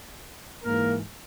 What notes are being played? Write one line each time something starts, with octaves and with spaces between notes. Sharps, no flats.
G#2 E3 A#3 A#4